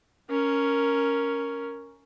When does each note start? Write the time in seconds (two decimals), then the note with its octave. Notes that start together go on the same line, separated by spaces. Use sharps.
0.30 C#4 A#4